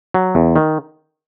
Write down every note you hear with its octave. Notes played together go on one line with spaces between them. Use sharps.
F#3
E2
D#3